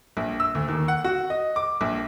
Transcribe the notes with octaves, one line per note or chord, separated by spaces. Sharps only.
A#1
E6
D2
D#2
F#5
F#4
D#5
D6
A#1